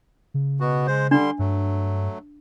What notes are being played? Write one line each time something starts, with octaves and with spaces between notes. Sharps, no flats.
C#3
B2 B3 F#4
G#3 C5
D3 G3 D4 C6
G2 F#3 A3